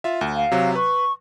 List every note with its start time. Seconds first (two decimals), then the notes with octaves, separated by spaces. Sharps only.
0.04 F4 E5
0.21 D2
0.35 F5
0.52 C3 F#3
0.75 B4 C#6